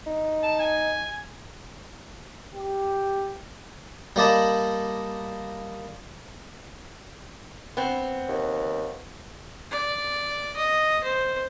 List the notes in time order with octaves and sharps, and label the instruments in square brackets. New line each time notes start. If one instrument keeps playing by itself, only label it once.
[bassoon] D#4
[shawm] A5
G#5
[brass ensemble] G4
[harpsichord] G3 A#3 D5 D#5 A5 B5
[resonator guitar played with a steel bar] B3 C4
[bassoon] D#2
[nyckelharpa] D5
D#5
C5